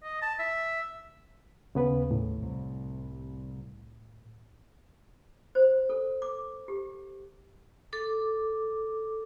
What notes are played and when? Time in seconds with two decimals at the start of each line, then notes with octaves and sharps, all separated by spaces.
0.03 D#5
0.22 A5
0.39 E5
1.75 D#2 C#3 B3 B4
2.11 A2
2.38 C2 C3
5.55 C5
5.90 A4
6.22 D6
6.68 G4
7.93 A4 D6